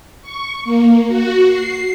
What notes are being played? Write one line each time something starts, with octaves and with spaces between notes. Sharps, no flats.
C#6
A#3
F#4
C7